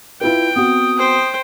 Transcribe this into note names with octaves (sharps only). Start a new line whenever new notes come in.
E4 F4 B4 G5
B3 C4 F#4 D#6
C5 G5